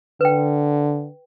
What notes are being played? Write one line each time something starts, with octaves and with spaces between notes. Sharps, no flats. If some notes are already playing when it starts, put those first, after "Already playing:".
D3 B4 G5